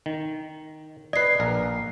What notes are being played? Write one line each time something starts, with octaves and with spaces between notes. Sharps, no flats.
D#3
B4 D5 D#5 C7
A#1 A#4